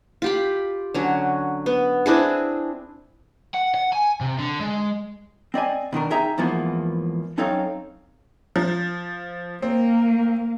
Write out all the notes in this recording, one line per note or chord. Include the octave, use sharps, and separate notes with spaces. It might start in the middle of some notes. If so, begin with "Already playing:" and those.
F4 G4 B5
D3 F#3 C#4
B3
C4 D4 E4 G#4
F#5
F#5
G#5
C3
D3
G#3
C4 D5 D#5 G#5
B2 D#3 D4 A#4
D#4 G#4 E5 G5 A#5
E2 G#2 E3 F3 A#3 B3
F#2 C4 D#4 A4 C#5 F5
F3
A#3 C4